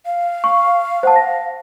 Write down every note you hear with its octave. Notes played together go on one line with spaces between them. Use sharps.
F5
C#6
C5 F#5 A5
A#6